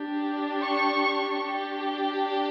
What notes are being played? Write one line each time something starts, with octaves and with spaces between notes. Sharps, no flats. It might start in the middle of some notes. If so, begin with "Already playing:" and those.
Already playing: D4 G4
C#6
D4 G4